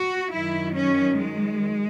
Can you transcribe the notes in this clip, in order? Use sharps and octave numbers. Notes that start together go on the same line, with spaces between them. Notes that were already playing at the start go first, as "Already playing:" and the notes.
Already playing: F#4
F#2 D#3 F#3 E4
C#4
G#3